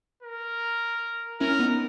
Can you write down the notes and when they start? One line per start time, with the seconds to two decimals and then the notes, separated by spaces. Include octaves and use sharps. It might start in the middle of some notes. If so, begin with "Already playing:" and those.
0.23 A#4
1.40 C#4 E4 A#4
1.59 B3 D#4